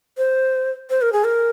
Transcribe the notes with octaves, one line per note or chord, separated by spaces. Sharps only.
C5
C5
A#4
G#4
A#4